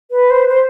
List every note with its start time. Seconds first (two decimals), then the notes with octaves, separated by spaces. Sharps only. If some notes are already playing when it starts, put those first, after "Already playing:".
0.11 B4
0.30 C5
0.49 C5